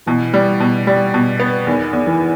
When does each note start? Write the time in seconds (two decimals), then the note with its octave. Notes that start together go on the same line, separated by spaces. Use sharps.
0.06 B2 E3
0.34 G3
0.60 B2
0.87 G3
1.14 B2
1.40 B3
1.67 E2 D#3
1.93 E2
2.07 E3